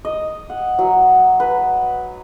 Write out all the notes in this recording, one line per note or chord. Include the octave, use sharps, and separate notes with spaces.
D#5
F#5
F#3
B4